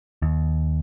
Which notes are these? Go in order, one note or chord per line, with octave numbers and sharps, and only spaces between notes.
D#2